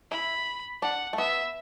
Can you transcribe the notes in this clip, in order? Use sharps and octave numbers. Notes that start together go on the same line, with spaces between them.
E4 B5
D4 F#5
A3
B3 E5